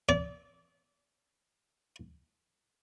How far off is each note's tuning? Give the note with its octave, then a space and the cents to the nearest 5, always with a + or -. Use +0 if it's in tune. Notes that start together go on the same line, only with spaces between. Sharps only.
D5 -35